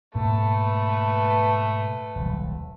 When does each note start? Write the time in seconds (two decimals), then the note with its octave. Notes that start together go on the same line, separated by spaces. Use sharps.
0.15 G#2 B2 A3 A#3 B4
2.15 D#1 C2 F#3